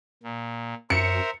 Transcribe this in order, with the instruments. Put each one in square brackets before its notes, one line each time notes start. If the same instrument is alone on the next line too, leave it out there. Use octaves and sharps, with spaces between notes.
[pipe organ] A#2
[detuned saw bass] F#2 [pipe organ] A#4 C5 E5 [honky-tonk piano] C#7